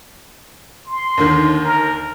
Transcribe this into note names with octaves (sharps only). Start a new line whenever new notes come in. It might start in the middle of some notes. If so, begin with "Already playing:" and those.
C6
D#2 D3 D#3
A#4